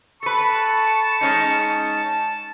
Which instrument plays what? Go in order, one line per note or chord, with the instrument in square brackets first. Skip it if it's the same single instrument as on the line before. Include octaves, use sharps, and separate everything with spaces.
[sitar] A4 B4 [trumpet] A5 [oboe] C#6
[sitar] G#3 C#4 D#4